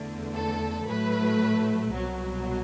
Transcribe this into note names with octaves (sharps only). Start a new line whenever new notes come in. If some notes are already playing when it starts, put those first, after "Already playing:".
Already playing: E2 D3 A3
A4
A2 F#3 A3 B4
C2 B2 F#3